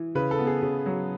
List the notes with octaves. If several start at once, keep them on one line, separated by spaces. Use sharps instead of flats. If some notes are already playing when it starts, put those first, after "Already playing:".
Already playing: E3
C#3 B4
A4
B3
G#4
C#3
F#3